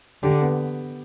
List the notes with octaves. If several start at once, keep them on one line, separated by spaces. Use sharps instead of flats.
D3 G4
B3